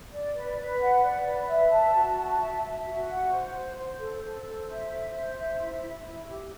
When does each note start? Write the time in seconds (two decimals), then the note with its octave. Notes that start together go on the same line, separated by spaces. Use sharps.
0.12 D5
0.34 B4
0.57 B4
0.79 F#5
1.03 D5
1.26 B4
1.48 E5
1.71 A5
1.94 F#4
2.17 A5
2.39 E5
2.63 E5
2.85 F#4
3.08 F#5
3.31 C5
3.53 C5
3.77 C5
3.99 A4
4.22 A4
4.45 C5
4.68 E5
4.91 C5
5.14 C5
5.37 E5
5.58 E4
5.82 E4
6.05 E4
6.27 G4